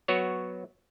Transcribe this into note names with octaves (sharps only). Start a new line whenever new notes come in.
F#3 B3 F#4 C#5